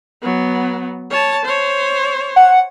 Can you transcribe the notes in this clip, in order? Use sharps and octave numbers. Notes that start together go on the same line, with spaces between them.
F#3 B3
C#5 A5
C5 C#5
F#5